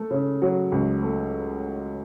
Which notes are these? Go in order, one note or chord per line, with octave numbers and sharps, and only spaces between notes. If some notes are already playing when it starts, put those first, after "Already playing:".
Already playing: A3
C#3
F#3
C#2
A3